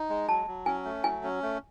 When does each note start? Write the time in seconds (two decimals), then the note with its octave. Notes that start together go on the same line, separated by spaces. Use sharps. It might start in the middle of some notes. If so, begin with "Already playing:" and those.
Already playing: D#4
0.10 G#3
0.28 F#3 A5
0.47 F#3
0.66 C#4 G#5
0.85 A3
1.04 F#3 G#5
1.23 C#4
1.42 A3